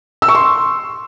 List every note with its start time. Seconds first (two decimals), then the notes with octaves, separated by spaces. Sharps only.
0.22 E6
0.28 C#6
0.35 C6